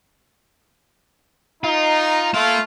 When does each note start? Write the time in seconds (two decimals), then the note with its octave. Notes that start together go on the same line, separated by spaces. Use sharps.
1.64 D#4 F4 A#5
2.34 A3 A#3 F4 F5